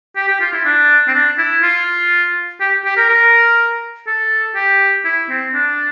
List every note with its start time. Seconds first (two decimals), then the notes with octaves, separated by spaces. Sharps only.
0.16 G4
0.28 G4
0.40 F4
0.53 E4
0.65 D4
1.08 C4
1.14 D4
1.38 E4
1.63 F4
2.60 G4
2.85 G4
2.97 A#4
3.09 A#4
4.07 A4
4.55 G4
5.05 E4
5.29 C4
5.54 D4